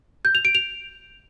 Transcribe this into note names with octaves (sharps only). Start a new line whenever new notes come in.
G6
F7
D7
F7